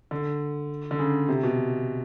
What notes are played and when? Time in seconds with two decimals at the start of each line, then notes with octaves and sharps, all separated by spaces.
0.11 D3
0.91 D3
0.99 C#3
1.29 C3
1.43 B2